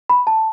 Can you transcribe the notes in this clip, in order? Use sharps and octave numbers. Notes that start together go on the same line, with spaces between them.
B5
A5